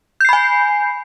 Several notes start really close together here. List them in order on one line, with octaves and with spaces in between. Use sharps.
G6 C7 B5 G#5